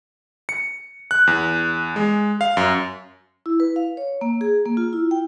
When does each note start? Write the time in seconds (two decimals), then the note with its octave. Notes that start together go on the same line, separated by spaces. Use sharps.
0.49 C#7
1.11 F#6
1.27 E2
1.96 G#3
2.41 F5
2.57 F#2
3.46 E4
3.60 B4
3.76 F5
3.97 C#5
4.21 A#3
4.41 G#4
4.65 A#3
4.77 F4
4.93 E4
5.11 G5